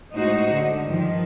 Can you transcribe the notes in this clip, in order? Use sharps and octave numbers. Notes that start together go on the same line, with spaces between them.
A2 G#3 D#4 F#4 C5
D3
G2 D#3 F3